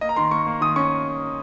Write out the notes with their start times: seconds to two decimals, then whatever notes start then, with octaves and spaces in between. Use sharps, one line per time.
0.01 A#3 D#5
0.09 A#5
0.16 D#3 C6
0.31 A#3 C#6
0.47 A#3
0.61 D#3 D#6
0.76 C#4 C#6